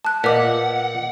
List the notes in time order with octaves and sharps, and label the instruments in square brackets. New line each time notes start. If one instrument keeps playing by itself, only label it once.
[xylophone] A5 F#6
[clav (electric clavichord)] A#2 [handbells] A#3 F4 B4 [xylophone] D#5 D6 B6 [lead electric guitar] F#5